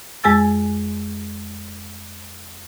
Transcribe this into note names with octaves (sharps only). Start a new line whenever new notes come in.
F2 G#3 G#4 G#5 E6 A6